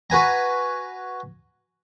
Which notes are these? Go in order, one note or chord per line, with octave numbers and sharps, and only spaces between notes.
F#4 B4 G#5 A#5